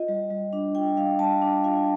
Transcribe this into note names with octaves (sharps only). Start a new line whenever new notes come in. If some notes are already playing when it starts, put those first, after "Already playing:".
Already playing: F4 D#5
G3
G3
D4
F4 G5
G3 F5
G3 A5
D4
F4 F5